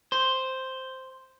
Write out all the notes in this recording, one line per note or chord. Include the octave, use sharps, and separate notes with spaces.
C5